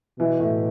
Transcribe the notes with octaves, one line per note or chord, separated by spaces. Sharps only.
B2 E3
A2